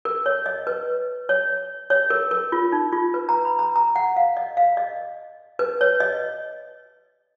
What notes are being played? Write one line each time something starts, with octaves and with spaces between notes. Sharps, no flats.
A#4
C#5
D#5
B4
C#5
C#5
A#4
A#4
F4
D#4
F4
B4
A#5
B5
A#5
A#5
F#5
F5
D#5
F5
D#5
B4
C#5
D#5